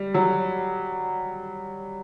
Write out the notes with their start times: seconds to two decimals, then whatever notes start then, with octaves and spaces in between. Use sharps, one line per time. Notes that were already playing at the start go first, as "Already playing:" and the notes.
Already playing: G3
0.14 F#3